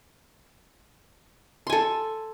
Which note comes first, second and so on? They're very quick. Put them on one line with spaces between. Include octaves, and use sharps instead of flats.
C6 G#5 A4